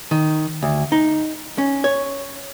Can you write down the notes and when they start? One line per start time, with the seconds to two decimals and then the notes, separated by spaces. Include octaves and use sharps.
0.11 D#3
0.63 D2
0.92 D#4
1.58 C#4
1.84 C#5